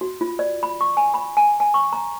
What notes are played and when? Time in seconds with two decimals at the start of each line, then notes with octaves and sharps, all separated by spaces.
0.01 F#4
0.21 F4
0.39 D5
0.63 B5
0.81 C#6
0.97 G#5
1.14 B5
1.37 G#5
1.60 G#5
1.74 C#6
1.93 A#5